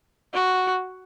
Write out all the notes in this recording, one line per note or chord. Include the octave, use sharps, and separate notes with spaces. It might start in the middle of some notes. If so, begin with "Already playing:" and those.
F#4